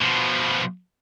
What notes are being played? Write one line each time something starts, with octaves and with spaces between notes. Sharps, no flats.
B2 F3